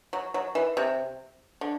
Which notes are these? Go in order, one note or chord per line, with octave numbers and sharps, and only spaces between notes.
F#3
F#3
E3
C3
D3